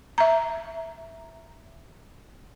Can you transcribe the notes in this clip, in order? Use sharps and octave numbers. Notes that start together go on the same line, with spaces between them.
E5 A#5